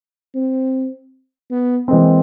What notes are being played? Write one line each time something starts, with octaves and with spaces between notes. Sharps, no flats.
C4
B3
E3 G#3 A#3 C4